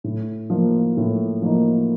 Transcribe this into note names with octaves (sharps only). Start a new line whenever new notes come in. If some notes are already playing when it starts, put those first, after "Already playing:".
A2
F3 A#3 D#4
A2
F3 A#3 D#4